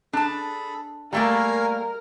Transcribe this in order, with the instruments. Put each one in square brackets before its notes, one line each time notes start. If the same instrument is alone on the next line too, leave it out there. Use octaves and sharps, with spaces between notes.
[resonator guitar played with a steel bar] D4 A5 [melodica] G#4 A4 B5
[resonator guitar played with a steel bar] G3 A3 A#3 [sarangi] A#4 [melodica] F5 G#5 A#5